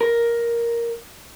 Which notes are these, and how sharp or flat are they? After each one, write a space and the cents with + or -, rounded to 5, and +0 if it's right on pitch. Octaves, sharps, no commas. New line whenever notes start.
A#4 +5